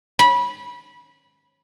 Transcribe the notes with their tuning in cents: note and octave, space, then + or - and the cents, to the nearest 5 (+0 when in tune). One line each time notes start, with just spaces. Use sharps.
B5 -20